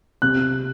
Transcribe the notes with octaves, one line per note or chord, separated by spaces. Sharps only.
C3 F#6